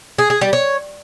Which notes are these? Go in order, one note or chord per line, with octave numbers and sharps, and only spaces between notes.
G#4
G#4
G3
C#5